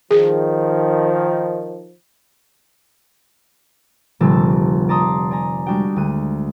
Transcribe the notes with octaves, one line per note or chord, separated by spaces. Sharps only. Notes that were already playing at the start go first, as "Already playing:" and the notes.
D#3 F3 G#4
F1 A#1 D3 G3 A4 A5
D5 D#5 A5 A#5 C6 D#6
D5 G#5 A#5
G3 G#3 D4 F#4 G5
D2 F#6 D#7